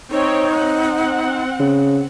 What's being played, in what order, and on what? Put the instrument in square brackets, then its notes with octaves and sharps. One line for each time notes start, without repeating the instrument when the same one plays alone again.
[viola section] C4 C#5 G5 [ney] D#4
[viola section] C4 F#5
[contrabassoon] C#3